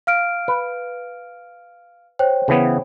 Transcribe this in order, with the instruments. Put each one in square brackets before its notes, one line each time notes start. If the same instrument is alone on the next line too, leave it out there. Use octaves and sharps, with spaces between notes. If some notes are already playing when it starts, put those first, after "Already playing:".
[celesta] F5 F6 D7
[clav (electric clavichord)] B4
[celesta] C5 C#5 G5
[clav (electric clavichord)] C#3 E3 B3